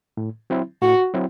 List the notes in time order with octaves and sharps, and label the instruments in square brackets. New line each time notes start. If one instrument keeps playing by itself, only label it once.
[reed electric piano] A2
F#3 C4 E4
[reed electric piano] A2 [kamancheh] F#4
[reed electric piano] F#3 C4 E4